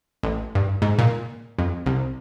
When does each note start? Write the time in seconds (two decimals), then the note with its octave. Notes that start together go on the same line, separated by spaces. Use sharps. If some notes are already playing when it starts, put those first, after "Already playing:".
0.23 A1
0.55 G2
0.82 G#2
0.99 A#2
1.59 F2
1.86 C2